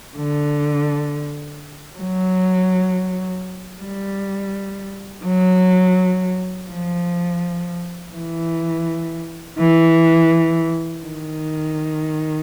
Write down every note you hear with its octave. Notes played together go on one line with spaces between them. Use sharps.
D3
F#3
G3
F#3
F3
E3
E3
D#3